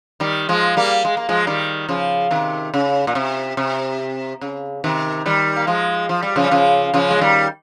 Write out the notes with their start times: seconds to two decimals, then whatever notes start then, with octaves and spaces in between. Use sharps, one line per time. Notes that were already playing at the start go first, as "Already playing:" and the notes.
0.20 D#3 G3
0.49 F3 G#3
0.77 G3 A#3
1.05 G#3
1.17 A#3
1.29 F3 G#3
1.47 D#3 G3
1.89 C#3 F3
2.31 C3 D#3
2.74 C#3
3.07 A#2
3.15 C3
3.57 C3
4.41 C#3
4.84 C3 D#3
5.26 D#3 G3
5.56 A#3
5.67 F3 G#3
6.09 F3
6.23 G3
6.36 C#3 F3
6.44 G3
6.51 C#3 F3
6.94 C#3 F3
7.10 G#3
7.21 D#3 G3